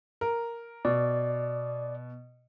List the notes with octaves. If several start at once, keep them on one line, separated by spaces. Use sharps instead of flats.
A#4
B2 D5